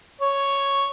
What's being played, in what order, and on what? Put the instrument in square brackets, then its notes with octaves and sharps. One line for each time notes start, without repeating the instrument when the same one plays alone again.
[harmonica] C#5